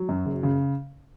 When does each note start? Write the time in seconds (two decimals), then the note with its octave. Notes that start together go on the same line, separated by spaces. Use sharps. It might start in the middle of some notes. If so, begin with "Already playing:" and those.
Already playing: F#3
0.09 F#2
0.25 F#1
0.43 C#3